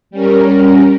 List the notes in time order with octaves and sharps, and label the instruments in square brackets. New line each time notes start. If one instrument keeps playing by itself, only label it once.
[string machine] G3 C#4 A#4